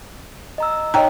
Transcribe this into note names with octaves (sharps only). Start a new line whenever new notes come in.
D#5 A#5 E6
D#4 C#5 D#5 G5 A#5